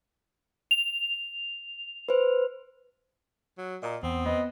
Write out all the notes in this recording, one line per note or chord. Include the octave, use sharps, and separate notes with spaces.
F7
B4 C5
F#3
A#2 D#5 A#5
E2 B3 C4
B3 D#5